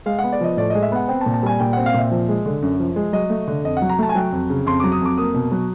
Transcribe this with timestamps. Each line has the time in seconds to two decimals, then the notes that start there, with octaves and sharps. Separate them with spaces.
0.06 G#3 F5
0.19 F#5
0.24 B3
0.32 D5
0.41 F3 D#5
0.57 A2 D5
0.70 G#3 D#5
0.83 E5
0.92 B3 F#5
1.08 C4 G5
1.21 A5
1.26 A#2
1.34 A5
1.43 G3 G#5
1.60 A#2 G5
1.73 C4 F#5
1.86 F5
1.94 A#2 E5
2.11 F3
2.29 G#3
2.46 D3
2.62 F#2
2.80 F3
2.96 G#3
3.13 F#3 D#5
3.30 A3
3.48 D3
3.64 F2 D#5
3.77 F#5
3.82 F#3
3.89 A#5
3.99 A3 A5
4.09 G#5
4.15 F#3 G5
4.32 F2
4.49 C#3
4.66 F2 C6
4.80 F#3 D6
4.92 D#6
5.01 F2 D6
5.18 A#3 D#6
5.34 B2
5.52 F#3